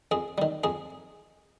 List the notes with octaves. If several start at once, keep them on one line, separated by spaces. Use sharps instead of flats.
F2 G#4
D#3 G3
F2 G#4